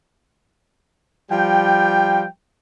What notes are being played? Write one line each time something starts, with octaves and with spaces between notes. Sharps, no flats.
F3 G3 G5